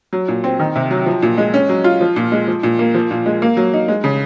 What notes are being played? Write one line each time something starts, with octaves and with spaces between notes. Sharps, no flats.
F#3
A#2
C4
D#3
C3
F#3
F3
A#2
G#3
C#4
F#3
F4
F3
A#2
G#3
F3
A#2
A#3
F3
A#2
G#3
A#3
F#3
D#4
G#3
C#3